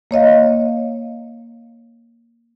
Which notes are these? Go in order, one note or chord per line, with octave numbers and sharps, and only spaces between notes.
A#3 C#5 D#5 F5